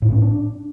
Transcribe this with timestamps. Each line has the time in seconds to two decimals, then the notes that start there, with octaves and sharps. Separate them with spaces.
0.02 A2
0.12 C#4
0.22 D4